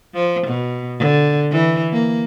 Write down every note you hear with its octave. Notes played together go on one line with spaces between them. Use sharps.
F3
B2
D3
E3
A#3